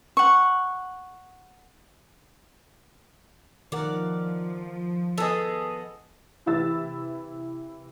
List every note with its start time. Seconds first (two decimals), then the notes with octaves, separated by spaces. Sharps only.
0.17 F#5 C#6
3.72 D#3 F3 A#4 D5 F#5
5.18 B3 G#4 A4 D#5
6.46 C3 E3 E4 E6 A6